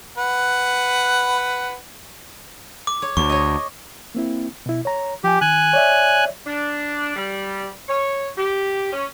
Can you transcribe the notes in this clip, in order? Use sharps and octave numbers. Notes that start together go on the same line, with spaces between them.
B4 F#5
D6
C#5
D2 C#6
C#5 D#5
A#3 C4 E4
B2 E4
C#5 A#5
F3 G4 G#5
D#3 G#5 F#6
C#5 D5 E5
D4
G3
C#5
G4
C#4